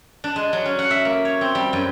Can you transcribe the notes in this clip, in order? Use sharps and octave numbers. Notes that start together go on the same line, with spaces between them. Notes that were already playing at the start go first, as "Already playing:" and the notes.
D4
G#3
F#3
C#4
F#5
E5
A#3
C#5
C4
G3
F#2